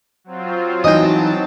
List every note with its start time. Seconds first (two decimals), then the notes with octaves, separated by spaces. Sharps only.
0.24 F#3 C4 F4
0.84 E3 F#3 C4 D#4 D#5 G5 A5